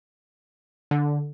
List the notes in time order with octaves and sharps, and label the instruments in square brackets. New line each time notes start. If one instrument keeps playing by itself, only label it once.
[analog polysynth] D3